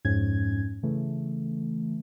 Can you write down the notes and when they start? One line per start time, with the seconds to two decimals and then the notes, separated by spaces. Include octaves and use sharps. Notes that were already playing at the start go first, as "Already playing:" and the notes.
0.05 F2 G#2 C#4 G#6
0.83 C#3 E3 A3